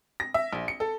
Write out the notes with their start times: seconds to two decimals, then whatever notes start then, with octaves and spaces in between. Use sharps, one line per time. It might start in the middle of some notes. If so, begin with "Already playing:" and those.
0.20 A#6
0.34 E5
0.53 A#1
0.68 C#7
0.80 A4